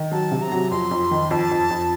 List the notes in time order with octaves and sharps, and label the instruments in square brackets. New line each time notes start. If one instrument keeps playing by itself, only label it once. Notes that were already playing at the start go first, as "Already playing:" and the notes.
Already playing: [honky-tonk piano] D#3
[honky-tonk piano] F#3 [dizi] A5
[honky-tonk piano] C3
[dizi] A#5
[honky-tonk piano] F#3
[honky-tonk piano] F2 [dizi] C6
[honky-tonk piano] F2
D#3
[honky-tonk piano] F2 [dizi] A5
[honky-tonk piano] F2
F2